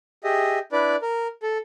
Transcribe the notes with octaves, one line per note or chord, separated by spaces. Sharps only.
G4 G#4 D#5 E5
D4 E4 B4 D5
A#4
A4